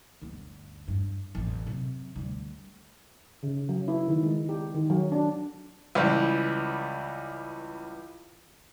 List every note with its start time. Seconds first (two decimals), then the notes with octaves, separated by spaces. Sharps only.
0.22 G1 D2
0.88 G2
1.35 A1 F2
1.67 C3 F#3
2.16 D2 G3
3.43 C#3
3.69 F#3
3.88 E4
4.08 D#3
4.23 G#3
4.49 G4
4.74 D#3
4.90 F#3
5.12 D4
5.95 C#2 E3 G3